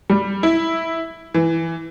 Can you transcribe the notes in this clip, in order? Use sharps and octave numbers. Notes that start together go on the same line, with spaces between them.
G3
E4
E3